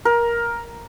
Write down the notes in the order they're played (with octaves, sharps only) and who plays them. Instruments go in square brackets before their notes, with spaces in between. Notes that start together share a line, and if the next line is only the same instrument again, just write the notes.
[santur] A#4